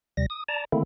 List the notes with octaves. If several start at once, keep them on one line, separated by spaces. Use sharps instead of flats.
D#2 C3 G3 A#6
D#6
D5 A5 A#5
D3 D#3 A3 A#3 C4 E4